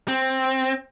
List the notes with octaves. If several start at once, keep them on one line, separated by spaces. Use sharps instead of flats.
C4